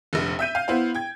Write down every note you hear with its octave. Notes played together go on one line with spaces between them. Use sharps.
F1 A#1
E5 G6 D#7
F5
B3 E4 C5 F5
G5 G#6